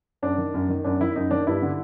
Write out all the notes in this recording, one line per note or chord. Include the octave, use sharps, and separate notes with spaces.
F#2 D4
D#3
F#2
D#3
F#2 D4
D#3 E4
F#2 D#4
D#3 D4
G2 E4
D3